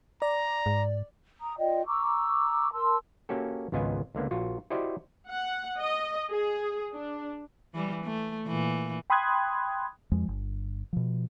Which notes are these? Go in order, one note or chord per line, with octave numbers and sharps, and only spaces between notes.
D5 A#5
G#2
A#5 D#6
F4 D5 D#5 G5
A#5 C#6 D6 E6
A#4 A5 C6 E6
A#3 C#4 F#4 G4 A4
G#1 C#2 B3 F4 D#5 G#5
C#2 D3 A#3 B3
A#1 F4 F#4
E4 F#4 G4 C5 D5 D#5
F#5
D#5
G#4
D4
E3 G3
A3
A#2 E3
G5 B5 C6 D#6 F#6 G#6
F2 F3 G#3
G1
B2 F3